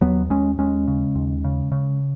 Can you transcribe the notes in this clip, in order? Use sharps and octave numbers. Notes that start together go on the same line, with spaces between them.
D#2 F#3 B3
D#2 G#3 C#4
D#2 G#3 C#4
C#3
D#2
C#3
C#3